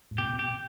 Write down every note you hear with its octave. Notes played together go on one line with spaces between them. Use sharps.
G#2
B2 G4
B2
G4